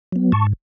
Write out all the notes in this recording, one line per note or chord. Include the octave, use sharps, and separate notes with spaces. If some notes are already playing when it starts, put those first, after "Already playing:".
F#3 B3
G#2 A5 C#6